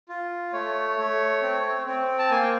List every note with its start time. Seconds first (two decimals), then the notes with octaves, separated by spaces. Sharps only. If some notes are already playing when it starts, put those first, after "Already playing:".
0.09 F4
0.53 A3 C#5
0.98 A3
1.42 C4
1.86 C4
2.19 A5
2.31 A#3 G#5
2.42 G5